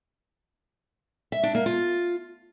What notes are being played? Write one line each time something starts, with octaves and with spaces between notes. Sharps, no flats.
E5
D4
A#3
F4